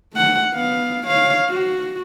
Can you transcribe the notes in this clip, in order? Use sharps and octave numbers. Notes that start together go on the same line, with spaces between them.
A3 F#5
B3 F5
C#5 F5
F#4